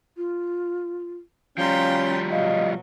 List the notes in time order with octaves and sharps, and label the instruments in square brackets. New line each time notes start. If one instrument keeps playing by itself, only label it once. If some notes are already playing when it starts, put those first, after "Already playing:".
[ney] F4
[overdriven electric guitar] F3 G3 [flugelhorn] C#4 [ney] F5 [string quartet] G5 A#5 C6
[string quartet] B2 F#3 [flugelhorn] D#5 [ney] F5